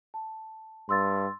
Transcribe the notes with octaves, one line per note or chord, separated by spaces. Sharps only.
A5
G2 C6 E6 A6